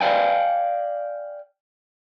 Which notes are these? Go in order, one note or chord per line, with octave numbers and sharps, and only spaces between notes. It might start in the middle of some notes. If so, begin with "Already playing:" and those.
D5 F5 G5 G#5